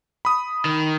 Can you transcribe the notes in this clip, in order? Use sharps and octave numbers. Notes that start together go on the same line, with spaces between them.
B5 D#6
D#3